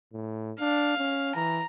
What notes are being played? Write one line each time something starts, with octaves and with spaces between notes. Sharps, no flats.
A2
D4 F5
C#4
E3 A#5